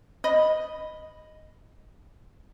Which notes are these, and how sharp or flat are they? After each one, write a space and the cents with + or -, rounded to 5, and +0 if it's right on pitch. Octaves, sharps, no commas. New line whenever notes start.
D#5 +0 B5 +0